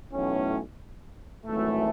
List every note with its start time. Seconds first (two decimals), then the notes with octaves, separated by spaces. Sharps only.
0.12 B1 A2 E3 A3 C#4
1.45 G#1 F#2 E3 A3